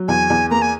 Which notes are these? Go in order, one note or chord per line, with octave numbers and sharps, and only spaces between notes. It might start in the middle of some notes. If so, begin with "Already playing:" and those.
Already playing: F#3
E2 G#5
E2
A#3 A#5
G#5